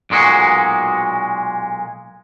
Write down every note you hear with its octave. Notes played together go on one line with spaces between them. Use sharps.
B1 A#2 G#3 F#4